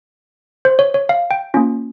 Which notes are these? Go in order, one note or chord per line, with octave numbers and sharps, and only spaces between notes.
C5
C#5
C#5
F5
G5
A#3 C#4 F4